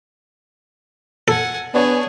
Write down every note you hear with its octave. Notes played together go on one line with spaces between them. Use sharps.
A4 F#5 G#5
B3 D4 G#4 C#5 G#5